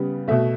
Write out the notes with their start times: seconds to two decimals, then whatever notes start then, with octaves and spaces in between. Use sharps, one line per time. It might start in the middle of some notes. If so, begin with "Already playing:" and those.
Already playing: C#3 G3 B3
0.28 B2 A3 E5